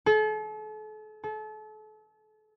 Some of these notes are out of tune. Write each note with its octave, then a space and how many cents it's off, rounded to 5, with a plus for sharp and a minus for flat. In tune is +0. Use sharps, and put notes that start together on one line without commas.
A4 -40
A4 -35